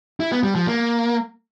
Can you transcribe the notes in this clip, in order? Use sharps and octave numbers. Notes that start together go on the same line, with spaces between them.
E4
B3
G3
F3
A#3